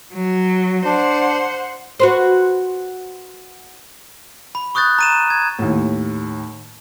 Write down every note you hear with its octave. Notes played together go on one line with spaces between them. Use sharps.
F#3
D4 C5 F#5
F#4 B4 C5
B5
C#6 D#6 F#6 G6 A6
A#5 D#7 E7
G#6
D#2 A2